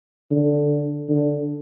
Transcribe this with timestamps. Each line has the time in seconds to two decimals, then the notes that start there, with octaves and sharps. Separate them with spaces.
0.31 D3
1.09 D3